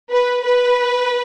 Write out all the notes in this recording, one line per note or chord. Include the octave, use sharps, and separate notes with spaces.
B4
B4